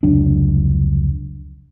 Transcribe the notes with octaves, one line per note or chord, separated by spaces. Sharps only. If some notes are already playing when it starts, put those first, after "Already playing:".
F1 C#2 F#3 D4